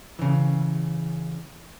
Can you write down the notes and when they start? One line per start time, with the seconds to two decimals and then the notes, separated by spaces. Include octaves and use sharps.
0.19 C#3 E3